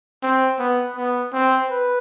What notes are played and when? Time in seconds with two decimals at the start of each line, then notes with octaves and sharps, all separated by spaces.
0.23 C4
0.59 B3
0.96 B3
1.33 C4
1.70 B4